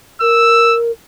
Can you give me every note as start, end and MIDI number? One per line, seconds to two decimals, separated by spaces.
0.21 0.91 70
0.21 0.78 88